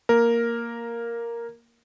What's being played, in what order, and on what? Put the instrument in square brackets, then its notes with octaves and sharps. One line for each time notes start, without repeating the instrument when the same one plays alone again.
[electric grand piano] A#3 A#4